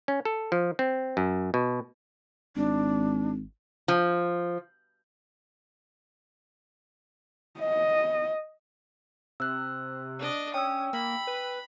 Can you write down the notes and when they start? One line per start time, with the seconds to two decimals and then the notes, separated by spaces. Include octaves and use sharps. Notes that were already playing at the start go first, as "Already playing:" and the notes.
0.08 C#4
0.25 A4
0.52 F3
0.79 C4
1.17 F#2
1.54 B2
2.56 G#1 D4
3.88 F3
7.60 D#5
9.40 C3 E6 F#6
10.19 D4 D#5
10.54 C#4 G5 D#6 E6
10.93 A#3 B5
11.27 B4